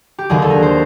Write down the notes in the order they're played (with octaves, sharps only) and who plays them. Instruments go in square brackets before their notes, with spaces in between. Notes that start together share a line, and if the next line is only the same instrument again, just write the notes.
[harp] G4
D#2 D3 F#3 G#4
A4
A#4
C5